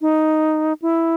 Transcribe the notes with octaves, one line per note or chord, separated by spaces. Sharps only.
D#4
E4